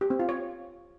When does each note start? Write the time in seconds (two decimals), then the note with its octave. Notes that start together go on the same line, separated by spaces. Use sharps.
0.01 G4
0.10 C4
0.19 F4
0.29 C#5